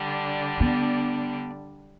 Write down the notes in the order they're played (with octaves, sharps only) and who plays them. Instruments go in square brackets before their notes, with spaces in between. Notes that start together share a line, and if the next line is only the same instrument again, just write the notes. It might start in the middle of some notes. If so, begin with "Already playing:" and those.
Already playing: [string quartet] D3 G3 D4
[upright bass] B3